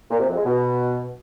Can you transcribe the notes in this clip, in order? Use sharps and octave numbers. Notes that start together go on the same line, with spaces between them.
A#2
C3
F2
G#3
B2